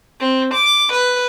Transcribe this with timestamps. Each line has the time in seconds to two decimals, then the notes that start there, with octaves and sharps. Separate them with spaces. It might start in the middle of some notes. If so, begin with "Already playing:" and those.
0.20 C4
0.54 D6
0.93 B4